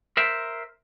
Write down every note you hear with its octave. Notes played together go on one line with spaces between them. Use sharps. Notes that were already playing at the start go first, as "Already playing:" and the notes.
A#4 C5 E5